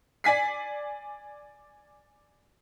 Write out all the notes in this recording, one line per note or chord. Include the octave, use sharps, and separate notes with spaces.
D5 G#5 B6 C7